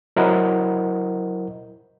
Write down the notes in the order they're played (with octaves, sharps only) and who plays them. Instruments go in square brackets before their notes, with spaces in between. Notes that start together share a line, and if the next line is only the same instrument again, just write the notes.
[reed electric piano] F#3 E4 A#4 C5 D#5 F#5